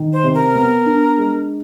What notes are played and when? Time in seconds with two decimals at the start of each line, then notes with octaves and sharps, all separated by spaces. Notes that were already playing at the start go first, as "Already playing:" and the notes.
Already playing: D#3
0.13 C5
0.24 C3
0.34 A#4
0.55 B3
0.86 D4
1.18 G#3